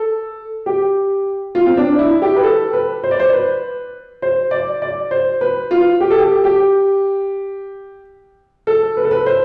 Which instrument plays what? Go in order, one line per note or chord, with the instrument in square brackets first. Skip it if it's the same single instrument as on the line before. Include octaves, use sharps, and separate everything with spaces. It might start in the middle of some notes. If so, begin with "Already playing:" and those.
Already playing: [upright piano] A4
G4
F4
C4
D4
E4
G4
B4
A4
B4
C5
D5
C5
B4
C5
D5
D5
C5
B4
F4
G4
A4
G4
G4
A4
B4
A4
B4
C5